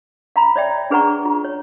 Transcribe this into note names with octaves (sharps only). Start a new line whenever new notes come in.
F5 A#5 B5
C#5 D5 E5 G5
D4 G#4 B4 F#5 A#5 C#6
F4
C#5